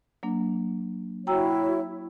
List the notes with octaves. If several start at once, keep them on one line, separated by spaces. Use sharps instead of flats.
F#3 A#3 D4
E4 F#4 C#5 G5 A#5 E6